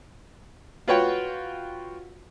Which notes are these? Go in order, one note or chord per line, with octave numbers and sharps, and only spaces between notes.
F4 F#4 B4 C#5 F#5 G5